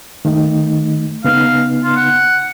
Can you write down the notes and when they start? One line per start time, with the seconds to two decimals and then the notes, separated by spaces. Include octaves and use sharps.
0.25 D#3 A3 D#4
1.24 C#3 B3 D#4 F5
1.83 F4
1.96 F#5